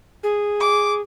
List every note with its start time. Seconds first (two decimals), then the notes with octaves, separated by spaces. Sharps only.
0.23 G#4
0.60 D6